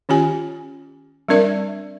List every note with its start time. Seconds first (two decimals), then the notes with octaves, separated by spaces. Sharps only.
0.09 D#3 C#4 F4 G4 G#5
1.29 G3 C4 D4 A#4 D5 E5